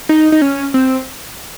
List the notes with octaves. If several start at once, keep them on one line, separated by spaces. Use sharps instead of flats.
D#4
D#4
C#4
C4